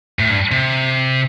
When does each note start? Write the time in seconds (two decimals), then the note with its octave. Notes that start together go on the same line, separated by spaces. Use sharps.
0.19 A2
0.30 G2
0.52 C3